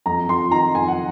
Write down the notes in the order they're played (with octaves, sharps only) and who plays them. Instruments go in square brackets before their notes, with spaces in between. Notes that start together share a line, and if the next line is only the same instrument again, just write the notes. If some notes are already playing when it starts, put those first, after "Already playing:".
[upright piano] F2 A#5
F2 C6
D#3 A#5
F2 G#5
F#5